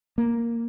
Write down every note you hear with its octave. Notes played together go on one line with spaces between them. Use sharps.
A#3